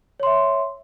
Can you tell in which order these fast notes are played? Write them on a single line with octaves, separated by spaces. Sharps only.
C#5 C6 E5